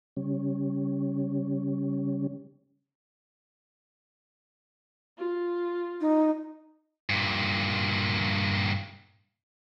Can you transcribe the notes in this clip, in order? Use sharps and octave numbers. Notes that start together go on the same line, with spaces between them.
C#3 G3 C#4
F4
D#4
G2 A#2